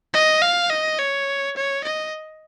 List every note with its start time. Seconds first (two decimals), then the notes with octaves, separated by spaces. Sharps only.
0.13 D#5
0.42 F5
0.70 D#5
0.98 C#5
1.56 C#5
1.84 D#5